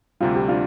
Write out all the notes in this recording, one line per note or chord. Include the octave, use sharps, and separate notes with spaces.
D2 C3 G3 F4
G4
D4 F4